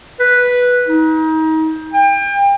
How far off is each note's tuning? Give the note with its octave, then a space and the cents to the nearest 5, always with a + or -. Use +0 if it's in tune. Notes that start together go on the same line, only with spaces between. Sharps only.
B4 -5
D#4 +30
G5 +30